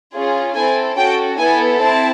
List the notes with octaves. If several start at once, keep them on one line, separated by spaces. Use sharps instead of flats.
C#4 F4 G#4
C4 E4 A4 G#5
C#4 F#4 A4 G5
B3 E4 A4 G#5
C4 E4 A5